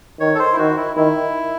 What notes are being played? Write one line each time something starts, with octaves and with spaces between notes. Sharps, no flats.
D#3 C#5
A4
C5
E4
D#3 F#4
E4
D#3 E4